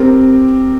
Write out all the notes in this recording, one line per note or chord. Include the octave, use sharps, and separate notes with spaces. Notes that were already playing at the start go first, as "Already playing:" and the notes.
Already playing: C4 G4 A#4